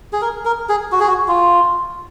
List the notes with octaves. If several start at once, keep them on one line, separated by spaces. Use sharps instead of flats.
G#4
A#4
A#4
G#4
F#4
G#4
F#4
F4